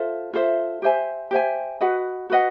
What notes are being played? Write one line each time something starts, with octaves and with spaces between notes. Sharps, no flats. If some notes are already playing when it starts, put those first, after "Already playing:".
Already playing: F4 A4 C5 E5
F4 A4 C5 E5
G4 C5 E5 G#5
G4 C5 E5 G#5
F#4 B4 D#5 F#5
F#4 B4 D#5 F#5